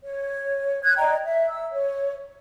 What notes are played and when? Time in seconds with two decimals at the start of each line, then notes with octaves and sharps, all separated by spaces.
0.03 C#5
0.83 F#6 G#6
0.97 D5 D#5 G5 A#5
1.24 E5
1.48 E6
1.71 C#5